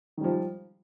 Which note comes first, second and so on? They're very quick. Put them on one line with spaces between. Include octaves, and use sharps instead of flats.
D#3 G3 F3